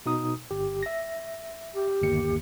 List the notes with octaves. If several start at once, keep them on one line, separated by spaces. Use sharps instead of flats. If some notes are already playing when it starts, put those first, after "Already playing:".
B2 D#4 D#6
G1 G4
E5 A#6
G4
G1 D#2 C#7